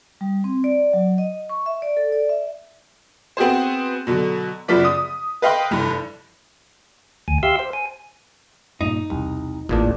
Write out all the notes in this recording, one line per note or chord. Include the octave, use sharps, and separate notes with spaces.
G3
C4
D5
F#3
D#5
C#6
E5
D5
A4
D5
E5
B3 C4 F#4 G#4 C5
B2 D3 F#3
F#2 C#3 F3 B3 D5 B6
D#6
B4 D#5 F5 G5 B5 C6
F1 G2 E3
D2 G#5
G4 E5 F5 C6 E6
C5
G#5
G2 A#2 D#4
E1 C2
A1 E2 A#2 D4